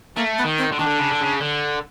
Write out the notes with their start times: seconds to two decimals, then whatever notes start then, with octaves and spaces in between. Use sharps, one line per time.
0.16 A3 A#3
0.38 B3
0.44 D#3
0.58 C4
0.72 D3
0.79 D#3 D4
0.87 D3
0.99 C#3
1.11 D3
1.21 C#3
1.41 D3